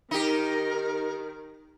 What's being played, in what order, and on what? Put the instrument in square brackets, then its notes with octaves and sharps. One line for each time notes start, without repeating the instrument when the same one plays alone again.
[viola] D#3 [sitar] D#4 G4 [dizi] A#4